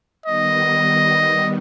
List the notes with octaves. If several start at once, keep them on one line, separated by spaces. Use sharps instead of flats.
D#3 G3 B3 D#5